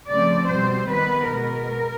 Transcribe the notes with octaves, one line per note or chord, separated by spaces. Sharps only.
C#3 F3 A3 C4 D5
B2 G3 C4 C5
D#3 G3 B3 B4
B2 G#3 B3 A#4